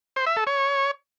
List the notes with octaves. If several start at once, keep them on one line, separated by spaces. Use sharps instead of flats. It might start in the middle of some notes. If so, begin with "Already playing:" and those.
C5
E5
A4
C#5